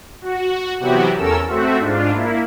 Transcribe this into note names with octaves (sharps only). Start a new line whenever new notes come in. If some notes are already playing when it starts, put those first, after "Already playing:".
F#4
C3 E3 F#3 B3 F#4 G4
E2 C#4 A4 A#4 E6
A3 C4 F#4 E5
G#2 D4 F4
A#3 E4